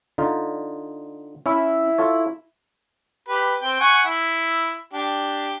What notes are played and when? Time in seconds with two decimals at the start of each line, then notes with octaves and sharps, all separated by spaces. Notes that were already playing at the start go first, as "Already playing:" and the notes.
0.18 D3 D#4 F4
1.46 C#4 E4
1.98 F4 A4 C#5
3.28 G4 B4
3.62 C4 G5
3.80 F#5 G#5 C#6
4.05 E4
4.93 D4 G4